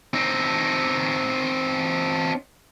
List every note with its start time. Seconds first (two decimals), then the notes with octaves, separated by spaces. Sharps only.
0.14 C4 D#4